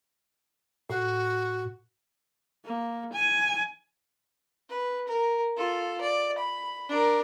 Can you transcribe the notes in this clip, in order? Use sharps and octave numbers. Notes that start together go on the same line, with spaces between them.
A2 F#4
A#3
G#5
B4
A#4
F4 A4
D5
B5
D4 A#4